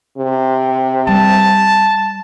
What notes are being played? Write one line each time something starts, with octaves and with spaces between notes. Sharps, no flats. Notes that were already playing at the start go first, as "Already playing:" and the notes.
C3
G3 A5